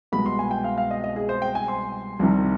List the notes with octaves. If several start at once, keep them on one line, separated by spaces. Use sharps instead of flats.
C2 B2 G#3 B5
C6
G#5
G5
F5
F5
D#5
D#5
G#4
C5
G5
G#5
C6
C2 C3 D#3 G3